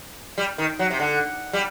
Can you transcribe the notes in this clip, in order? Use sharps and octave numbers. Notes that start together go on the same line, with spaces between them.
G3
D#3
F#3
C3
D3
G3